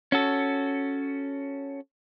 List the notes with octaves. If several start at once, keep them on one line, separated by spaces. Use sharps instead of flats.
C#4 F#4 A4